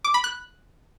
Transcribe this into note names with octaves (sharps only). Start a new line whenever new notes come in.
D6
B5
F#6